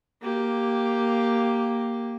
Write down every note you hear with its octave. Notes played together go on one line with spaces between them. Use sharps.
A#3 G4